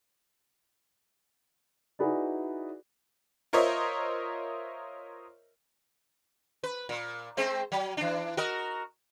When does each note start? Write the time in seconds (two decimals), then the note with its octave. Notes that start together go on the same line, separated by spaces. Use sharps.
1.99 D#4 E4 F#4 G#4 B4 D5
3.53 F4 A#4 C5 C#5 D#5 E5
6.63 B4
6.89 A#2
7.37 G#3 C4 C5
7.72 F#3
7.97 E3 D4
8.37 F#4 A#4 D#5